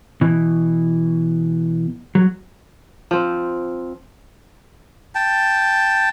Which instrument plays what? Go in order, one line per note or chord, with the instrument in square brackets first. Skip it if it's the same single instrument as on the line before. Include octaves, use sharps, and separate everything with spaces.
[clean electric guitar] B2 E3
F#3
[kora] F3 C4
[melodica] G5 A5